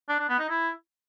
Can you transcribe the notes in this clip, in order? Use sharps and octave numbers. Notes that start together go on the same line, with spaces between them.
D4
D4
B3
D#4
E4